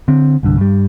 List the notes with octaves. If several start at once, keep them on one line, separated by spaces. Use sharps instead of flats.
D3 C4
C2 G2 D3
G2 G3